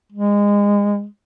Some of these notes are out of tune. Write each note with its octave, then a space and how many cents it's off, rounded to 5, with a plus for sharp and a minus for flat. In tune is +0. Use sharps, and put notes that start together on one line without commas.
G#3 -25